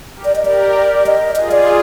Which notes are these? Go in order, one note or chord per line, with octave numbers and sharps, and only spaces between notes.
G4 A#4
D5
D#5
G4 A#4 D5
D#5
F4 G#4 D#5
D5